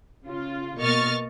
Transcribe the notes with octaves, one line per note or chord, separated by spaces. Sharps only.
C#3 F4
B2 A#3 D#5 C#6 F6 A6